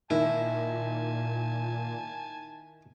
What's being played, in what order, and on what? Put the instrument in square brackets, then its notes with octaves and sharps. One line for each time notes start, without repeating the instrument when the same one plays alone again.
[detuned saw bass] A#2 [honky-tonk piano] D#3 [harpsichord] E4 [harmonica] G#5 A5